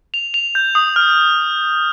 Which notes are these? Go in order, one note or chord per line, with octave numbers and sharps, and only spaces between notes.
F7
F7
G6
D#6
F6